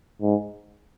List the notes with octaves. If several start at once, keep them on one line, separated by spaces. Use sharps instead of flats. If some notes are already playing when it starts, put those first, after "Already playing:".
G#2